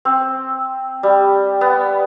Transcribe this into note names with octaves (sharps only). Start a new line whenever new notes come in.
C4
G3
B3